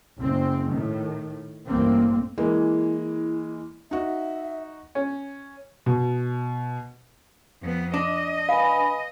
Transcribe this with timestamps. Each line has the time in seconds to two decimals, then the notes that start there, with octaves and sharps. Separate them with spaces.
0.16 F#1 C4
0.70 A2 D#3
1.65 A1 G2 A#3 C4
2.38 E3 G#3 A#3 E4
3.91 D#4 F#4 E5
4.95 C#4
5.86 B2
7.62 F2 B3
7.94 D4 D#5
8.49 B4 F5 G#5 B5